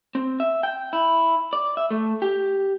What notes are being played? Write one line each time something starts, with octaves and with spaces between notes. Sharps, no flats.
C4
E5
G5
E4
D5
E5
A3
G4